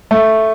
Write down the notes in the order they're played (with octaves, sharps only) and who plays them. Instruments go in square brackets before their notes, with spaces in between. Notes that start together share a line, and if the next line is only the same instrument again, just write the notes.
[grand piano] A3